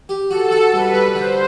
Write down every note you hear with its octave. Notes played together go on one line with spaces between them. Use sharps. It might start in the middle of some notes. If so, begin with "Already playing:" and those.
G4
F#4 A4
F#4
G3 B4
G3
D3 C5